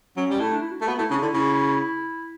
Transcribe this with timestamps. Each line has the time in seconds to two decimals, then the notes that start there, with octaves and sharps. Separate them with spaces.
0.17 F#3 C#4
0.30 G3
0.39 A3 E4
0.52 D4
0.62 E4
0.72 F#4
0.81 A3
0.87 B3 F#4
0.99 A3 E4
1.10 C#3 D4
1.22 D3 E4
1.34 C#3 E4